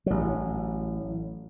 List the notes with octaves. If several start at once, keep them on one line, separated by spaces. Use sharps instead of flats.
A1 F#3